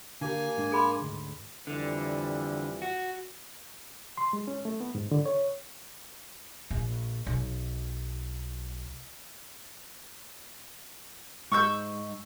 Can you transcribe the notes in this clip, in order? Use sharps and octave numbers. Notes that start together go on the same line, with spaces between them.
D3 A#3 G4 G#5
G#2 G#3 D4
G#4 B5 C6
D2 G#2
F2 D3 E3 G3
F#4
C6
G#3
C#4
A3
B3
G#2
D3
C#5
A#1
B1
G#2 C#6 E6 G6